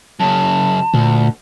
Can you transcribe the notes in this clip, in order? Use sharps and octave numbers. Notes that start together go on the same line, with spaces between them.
F#2 C#3 A5
D2 A#2